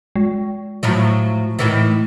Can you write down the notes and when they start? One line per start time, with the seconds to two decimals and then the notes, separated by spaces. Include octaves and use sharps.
0.16 G#3
0.83 A2 F3 F#3
1.59 A2 D#3 E3